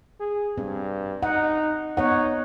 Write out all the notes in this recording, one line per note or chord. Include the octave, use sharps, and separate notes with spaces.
G#4
G2 C4
D#4 F#5
B3 D#4 C#5 F#5